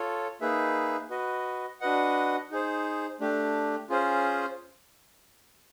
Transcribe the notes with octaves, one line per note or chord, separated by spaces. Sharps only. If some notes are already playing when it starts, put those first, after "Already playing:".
Already playing: F4 A4 C#5
A#3 D#4 G#4 B4 E5
F#4 B4 D#5
D4 F#4 B4 D#5 F#5
D#4 G#4 C5
A3 D4 G4
C#4 F4 G#4 C5